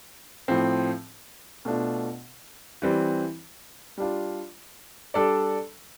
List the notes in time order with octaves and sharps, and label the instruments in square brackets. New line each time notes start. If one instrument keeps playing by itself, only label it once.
[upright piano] A2 F3 C4
B2 A3 D4 F4
E3 G3 C4
G3 D4 F4
G3 D4 A4 D5